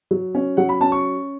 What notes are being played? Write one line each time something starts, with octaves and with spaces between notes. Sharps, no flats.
F#3
C#4
F#3 F#5
B5
C#4 A5
C#6